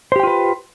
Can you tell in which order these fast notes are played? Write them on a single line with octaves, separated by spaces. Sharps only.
C5 G4 G5 F4 B4